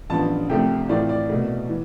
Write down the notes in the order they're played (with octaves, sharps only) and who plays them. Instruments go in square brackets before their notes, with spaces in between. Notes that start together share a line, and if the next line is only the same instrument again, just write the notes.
[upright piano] A1 G2 F3 B3 F4 A5
C2 C3 F3 A3 C4 G5
A2 E3 A3 C4 F4 D5
D5
C2 B2 A3
E3